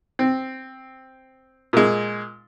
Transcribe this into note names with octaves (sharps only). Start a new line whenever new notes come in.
C4
A#2 G#3